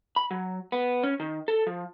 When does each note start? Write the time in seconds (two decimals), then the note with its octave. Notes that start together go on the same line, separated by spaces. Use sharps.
0.16 B5
0.31 F#3
0.72 B3
1.04 C#4
1.20 D#3
1.48 A4
1.67 F3